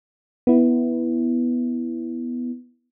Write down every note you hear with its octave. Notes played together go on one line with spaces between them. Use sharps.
B3 E4